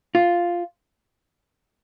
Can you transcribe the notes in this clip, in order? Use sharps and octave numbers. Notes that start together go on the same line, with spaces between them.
F4